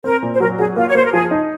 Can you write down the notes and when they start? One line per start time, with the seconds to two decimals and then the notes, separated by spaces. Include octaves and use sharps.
0.04 C4 A#4
0.22 A#2
0.34 C5
0.40 F#3 A#4
0.59 F#3 G#4
0.76 A#3 F4
0.89 C#5
0.95 A#3 C5
1.05 A#4
1.12 F3 G#4
1.31 D#4